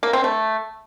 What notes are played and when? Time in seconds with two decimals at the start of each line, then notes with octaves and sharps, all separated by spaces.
0.03 A#3
0.13 C4
0.24 A3